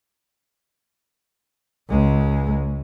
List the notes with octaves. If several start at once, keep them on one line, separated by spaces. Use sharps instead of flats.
C#2 G#3